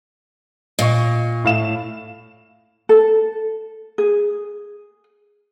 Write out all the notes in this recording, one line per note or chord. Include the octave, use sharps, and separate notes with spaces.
A#2 D#5 C#6
A2 F5 E7
A4
G#4